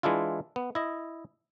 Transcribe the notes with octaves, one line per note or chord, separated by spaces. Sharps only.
E3 G#3 D4 E4 F4
B3
E4 D#5